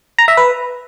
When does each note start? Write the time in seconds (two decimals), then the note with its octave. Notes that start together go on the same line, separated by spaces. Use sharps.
0.19 A#5
0.28 E5
0.37 B4